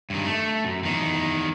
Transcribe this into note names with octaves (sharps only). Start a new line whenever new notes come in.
G2 D#3
A3
F#2
E2 D#3